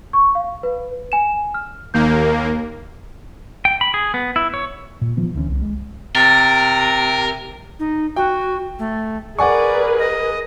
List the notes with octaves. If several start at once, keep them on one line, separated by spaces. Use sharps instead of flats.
C#6
F5
B4
G#5 E7
F6
D#2 A#3 G6
G5
B5
G#4
B3
E4
C#5
A#2
E3 F3 B3
D2 E3 C4 C#4
C2
G#3
C3 A#4 A6
D#4
F#4 G5
A3
G#4 A#4 B4 D5 F#5 G#5 C#6
D#5